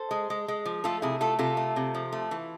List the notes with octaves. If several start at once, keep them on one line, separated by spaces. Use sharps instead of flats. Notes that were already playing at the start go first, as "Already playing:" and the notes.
Already playing: A4 C5
G#3
G#3
G#3
F3
A3 F4 A4
C3 E4 G#4
A3 F4 A4
C3 F4 A4
A3
C3
F3
A3
E3